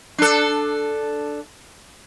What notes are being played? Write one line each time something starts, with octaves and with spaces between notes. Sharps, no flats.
D4 A4